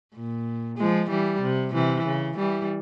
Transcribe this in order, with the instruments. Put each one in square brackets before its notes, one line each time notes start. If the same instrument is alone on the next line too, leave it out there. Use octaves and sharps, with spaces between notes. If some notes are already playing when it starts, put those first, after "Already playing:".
[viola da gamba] A#2
F3 G#3
E3 G3
C3
C3 E3
C#3
E3 G3